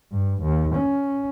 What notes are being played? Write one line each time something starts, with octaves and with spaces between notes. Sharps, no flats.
G2
D#2
C#4